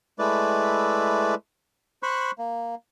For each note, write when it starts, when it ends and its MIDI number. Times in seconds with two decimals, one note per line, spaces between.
0.19 1.35 56
0.19 1.35 57
0.19 1.35 64
0.19 1.35 71
0.19 1.35 74
2.03 2.31 72
2.03 2.31 83
2.03 2.31 85
2.03 2.31 90
2.38 2.75 58